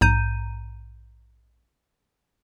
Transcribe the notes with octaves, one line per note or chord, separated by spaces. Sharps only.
A#1 G#2 A#5 G6 D#7